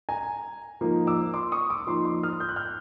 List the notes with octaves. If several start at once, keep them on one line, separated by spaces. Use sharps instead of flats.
G#5 A#5
F3 A#3 D#4
D6 E6
C6 D6
C#6 D#6
D6 E6
F3 A#3 D#4 C6 D6
C6 D6
D#6 F6
G6
F#6
F6 G6